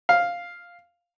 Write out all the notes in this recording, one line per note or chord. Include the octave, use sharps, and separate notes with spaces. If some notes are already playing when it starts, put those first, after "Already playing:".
F5